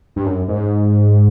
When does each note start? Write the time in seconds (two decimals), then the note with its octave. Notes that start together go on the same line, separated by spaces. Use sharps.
0.16 G2
0.26 F#2
0.48 G#2